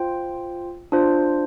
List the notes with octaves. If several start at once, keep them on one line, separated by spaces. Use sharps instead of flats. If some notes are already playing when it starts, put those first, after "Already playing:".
Already playing: F4 C5 G5
D4 F4 C5